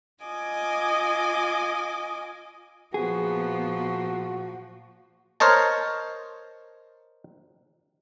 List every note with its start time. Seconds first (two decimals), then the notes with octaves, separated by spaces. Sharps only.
0.23 F4 D#5 G#5 D6
2.94 A#2 F3 B3 F#4 G#4
5.40 A#4 C5 C#5 D#5 A5